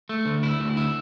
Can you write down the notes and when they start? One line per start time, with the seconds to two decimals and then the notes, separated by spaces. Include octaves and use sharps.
0.09 A3
0.26 D2
0.43 E4
0.60 D2
0.77 E4